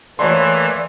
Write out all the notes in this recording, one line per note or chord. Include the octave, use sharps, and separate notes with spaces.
E3 A3 A#3 A4 C#5 D5 B5 C6